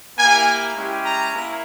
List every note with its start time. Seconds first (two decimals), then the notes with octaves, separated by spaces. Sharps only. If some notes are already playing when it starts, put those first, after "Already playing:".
0.18 A#3 E4 G4 G#5
0.76 G#3 C#4 E4 G4
1.05 A#5
1.34 A#3 E4